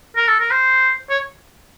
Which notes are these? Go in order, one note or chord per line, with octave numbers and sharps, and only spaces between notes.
A#4
A4
A#4
C5
C#5